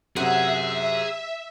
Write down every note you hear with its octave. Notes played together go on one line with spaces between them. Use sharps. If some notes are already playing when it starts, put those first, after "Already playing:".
F#2 C3 G#4 E5 F#5